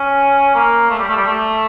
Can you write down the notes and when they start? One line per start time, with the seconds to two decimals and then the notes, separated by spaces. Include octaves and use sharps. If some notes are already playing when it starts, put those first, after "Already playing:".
Already playing: C#4
0.55 A#3
0.90 A3
0.99 G3
1.08 A3
1.16 G3
1.26 A3